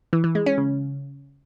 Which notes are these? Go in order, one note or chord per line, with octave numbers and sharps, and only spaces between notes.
E3
E3
G#3
C#4
C#3